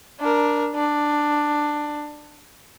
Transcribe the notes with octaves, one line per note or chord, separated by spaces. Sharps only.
D4 A#4
D4